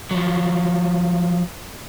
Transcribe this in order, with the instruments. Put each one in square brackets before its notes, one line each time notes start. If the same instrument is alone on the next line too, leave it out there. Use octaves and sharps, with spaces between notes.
[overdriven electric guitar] F3 F#3